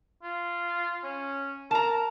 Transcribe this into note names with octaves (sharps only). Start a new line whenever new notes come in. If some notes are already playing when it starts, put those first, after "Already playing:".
F4
C#4
A#4 A5 A#5